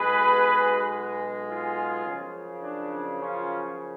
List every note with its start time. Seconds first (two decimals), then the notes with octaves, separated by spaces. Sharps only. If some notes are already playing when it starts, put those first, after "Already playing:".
Already playing: B1 B2 G#3 G#4 B4
1.51 F4 G#4
2.07 F#2 C#3 F3
2.63 D4
3.20 C#4 F4